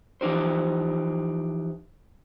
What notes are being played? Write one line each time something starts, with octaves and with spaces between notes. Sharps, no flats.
E3 F3 D#4 G4 C5